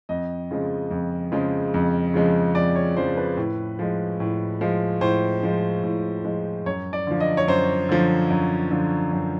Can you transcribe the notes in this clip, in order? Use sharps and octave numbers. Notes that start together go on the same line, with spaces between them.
F2 D#5
C#3 F3 G#3
F2
C#3 F3 G#3
F2
C#3 F3 G#3
F2 D5
C#5
C#3 F3 G#3 C5
B4
A2
F3 G#3
A2
F3 G#3
A2 C5
F3 G#3
A2
F3 G#3
F#2 C#5
D5
D3 F3
D#5
C#5
F#2 C5
D3 F3
F#2
D3 F3
F#2